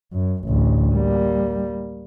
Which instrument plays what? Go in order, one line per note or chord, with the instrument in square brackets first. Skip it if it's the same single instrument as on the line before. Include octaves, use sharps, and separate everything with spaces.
[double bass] F#2
A1 D2
G3 A#3